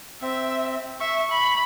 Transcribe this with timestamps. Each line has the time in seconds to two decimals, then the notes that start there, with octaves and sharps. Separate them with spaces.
0.22 C4 E5
1.00 E5 C#6
1.31 B5